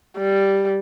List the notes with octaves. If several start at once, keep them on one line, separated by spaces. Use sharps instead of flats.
G3